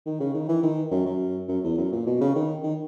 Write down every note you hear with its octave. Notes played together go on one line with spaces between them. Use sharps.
D#3
C#3
D#3
E3
D#3
F#2
F#2
F#2
E2
F#2
A#2
B2
C#3
D#3
D#3